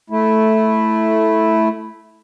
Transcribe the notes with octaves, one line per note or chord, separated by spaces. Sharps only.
A3 E4